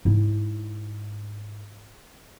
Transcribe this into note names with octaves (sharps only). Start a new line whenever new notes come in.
G#2 E4